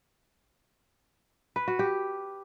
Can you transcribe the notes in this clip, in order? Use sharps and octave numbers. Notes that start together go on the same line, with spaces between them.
B4
F#4
G4